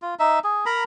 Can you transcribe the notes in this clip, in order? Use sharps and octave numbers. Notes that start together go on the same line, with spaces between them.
F4
D#4 E5
G#4
A#4 A#5 B5